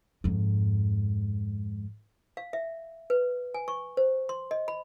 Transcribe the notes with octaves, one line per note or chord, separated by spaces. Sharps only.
F2 G#2
F5
E5
B4
G#5
C#6
C5
C6
D#5
B5